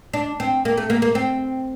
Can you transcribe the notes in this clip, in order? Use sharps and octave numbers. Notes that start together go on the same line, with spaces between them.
D4
C4
A#3
A3
A#3
A#3
C4